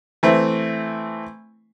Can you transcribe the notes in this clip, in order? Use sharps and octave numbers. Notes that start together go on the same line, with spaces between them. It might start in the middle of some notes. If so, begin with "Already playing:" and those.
E3 A3 C4